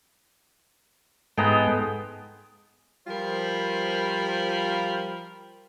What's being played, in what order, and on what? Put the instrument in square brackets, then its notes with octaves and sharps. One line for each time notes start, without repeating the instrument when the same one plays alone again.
[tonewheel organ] G#2 A4 G5 [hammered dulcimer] G#3 B3 A#5
[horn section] F3 G3 F4 A#4 C5 B5